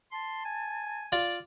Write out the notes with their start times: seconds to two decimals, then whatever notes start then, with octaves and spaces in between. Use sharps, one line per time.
0.12 A5 C6
0.45 G#5
1.12 F4 D5